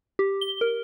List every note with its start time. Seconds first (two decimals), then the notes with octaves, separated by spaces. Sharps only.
0.19 G4
0.41 G7
0.61 A#4